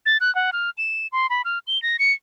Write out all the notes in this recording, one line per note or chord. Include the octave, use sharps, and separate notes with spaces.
A6
F#6
F#5
F6
E7
C6
B5
F6
G7
A#6
C#7